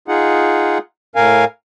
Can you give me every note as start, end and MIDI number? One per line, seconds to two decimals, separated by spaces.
0.08 0.78 63
0.08 0.78 65
0.08 0.78 68
0.08 0.78 78
1.16 1.45 45
1.16 1.45 70
1.16 1.45 77
1.16 1.45 80